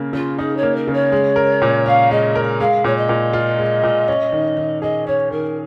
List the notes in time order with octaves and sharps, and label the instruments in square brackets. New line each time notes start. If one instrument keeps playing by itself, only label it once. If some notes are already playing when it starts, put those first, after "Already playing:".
Already playing: [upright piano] C#3 A#3
[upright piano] C#3 [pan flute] F4
[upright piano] D#4 [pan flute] G#4
[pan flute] C#5
[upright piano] A#3
[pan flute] A#4
[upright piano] C#3
[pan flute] C#5
[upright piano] G#3
A#4
A#2
[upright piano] C#4 [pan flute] F5
[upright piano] G#3 [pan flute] D#5
[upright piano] A#4
[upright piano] G#3 [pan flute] F5
[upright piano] A#2 [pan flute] C#5
[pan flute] D#5
[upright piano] A#2
F4
G#3
A#2
C#4
D#3
D#3
[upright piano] G#4 [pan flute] D#5
[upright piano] C#4 [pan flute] C#5
[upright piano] D#3 [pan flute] A#4